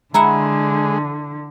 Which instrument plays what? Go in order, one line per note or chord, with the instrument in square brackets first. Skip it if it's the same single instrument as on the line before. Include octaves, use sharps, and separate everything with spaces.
[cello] D3 [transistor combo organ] G#3 [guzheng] E4 E5 F#5 [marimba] A#5